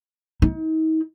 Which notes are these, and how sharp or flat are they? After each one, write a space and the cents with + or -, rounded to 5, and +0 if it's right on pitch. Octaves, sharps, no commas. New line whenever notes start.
D#4 +40